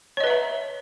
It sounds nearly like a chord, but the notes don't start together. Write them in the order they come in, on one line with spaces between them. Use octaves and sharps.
C#5 D#5 B4 E5 A#5